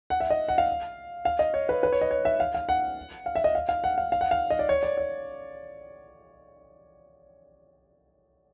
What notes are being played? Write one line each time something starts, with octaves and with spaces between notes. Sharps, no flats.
F#5
E5
D#5
F#5
F5
F5
D#5
C#5
B4
B4
C#5
D#5
C#5
E5
F5
F5
F#5
F5
E5
D#5
F5
F5
F#5
F5
F5
F#5
F5
D#5
D5
C#5
D5
C#5